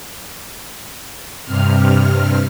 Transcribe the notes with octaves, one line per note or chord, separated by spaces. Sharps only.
G2 C3 F6